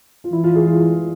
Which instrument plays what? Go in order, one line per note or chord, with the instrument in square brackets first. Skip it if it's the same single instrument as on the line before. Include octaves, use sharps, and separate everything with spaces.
[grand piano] F4
[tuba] E3 [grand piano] E4
[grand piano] F4
G#4
F4